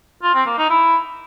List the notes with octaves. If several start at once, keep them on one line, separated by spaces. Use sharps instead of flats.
F4
C4
A#3
D#4
E4